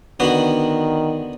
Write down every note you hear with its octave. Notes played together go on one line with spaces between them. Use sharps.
D3 D#3 B3 F#4